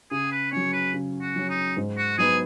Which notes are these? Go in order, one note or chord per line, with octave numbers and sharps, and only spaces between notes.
C#3 G#4
B4
F#3 C#4 C#5
B4
C#3
F#4
F#3 C#4
D#4
G#2
F#4
F#3 B3 D#4 G#4 B4